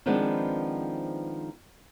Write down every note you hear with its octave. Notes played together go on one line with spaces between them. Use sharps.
D#3 F3 G#3 B3 C4 D4